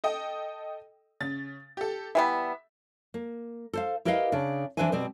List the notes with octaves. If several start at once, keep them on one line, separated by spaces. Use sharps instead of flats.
A4 D#5 G5
C#3 A6
G4 A4
E3 G3 B3 E5
A#3
A4 C5 F5
E4 G4 A#4 B4 D#5 F5
C#3 D4
E3 D4 B4 C5 E5 G#5
B2 G3 C4